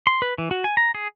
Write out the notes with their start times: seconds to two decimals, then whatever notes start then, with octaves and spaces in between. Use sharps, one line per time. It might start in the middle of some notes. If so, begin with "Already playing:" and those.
0.07 C6
0.22 B4
0.38 E3
0.51 F#4
0.64 G#5
0.77 A#5
0.95 G#4